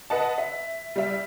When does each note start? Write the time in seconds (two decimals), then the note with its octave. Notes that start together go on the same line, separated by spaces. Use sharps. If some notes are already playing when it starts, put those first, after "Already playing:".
0.10 B4 D#5 F#5 A5
0.38 E5
0.96 G3 E5